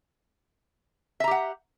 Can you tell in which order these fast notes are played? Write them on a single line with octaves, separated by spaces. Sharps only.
E5 A#5 G4 F#5